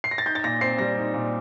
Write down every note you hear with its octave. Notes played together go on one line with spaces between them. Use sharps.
C7
A#6
A6
D#4 G6
A6
A#2 A#6
C4 C7
G3 A#6
D#4
A#2